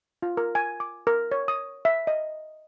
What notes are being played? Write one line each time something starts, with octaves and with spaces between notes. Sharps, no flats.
F4
A#4
G#5
D6
A#4
C#5
D#6
E5
D#5